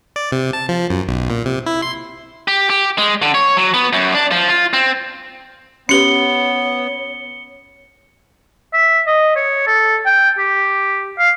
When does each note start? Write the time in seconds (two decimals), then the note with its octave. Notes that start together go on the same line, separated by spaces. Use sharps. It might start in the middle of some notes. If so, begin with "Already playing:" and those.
0.16 D5
0.32 C3
0.53 A5
0.69 F3
0.90 F#2
1.08 B1
1.30 A#2
1.46 C3
1.66 E4
1.82 C6
2.48 G4
2.70 G4
2.98 G#3
3.22 D3
3.34 C#5
3.57 F#3
3.74 B3
3.93 F#2
4.15 D4
4.31 F3
4.49 F4
4.73 C4
5.89 B3 C#4 G4 B4 C#5 C#7 G7
8.74 E5
9.07 D#5
9.36 C#5
9.67 A4
10.06 G5
10.38 G4
11.18 F5